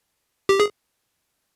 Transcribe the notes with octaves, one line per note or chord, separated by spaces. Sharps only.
G4
G#4